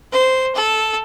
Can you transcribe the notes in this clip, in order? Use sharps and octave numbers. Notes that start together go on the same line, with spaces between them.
C5
A4